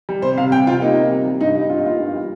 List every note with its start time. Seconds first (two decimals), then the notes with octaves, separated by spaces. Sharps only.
0.09 G3
0.22 C3 C5
0.38 C3 F5
0.52 G3 G5
0.67 C3 F4
0.82 A#3 D#4
0.96 C3
1.11 G3
1.26 G3
1.41 G2 D#4
1.56 G3 D#4
1.70 G2 F4
1.78 D#4
1.84 A#3 F4
2.00 G2
2.14 G3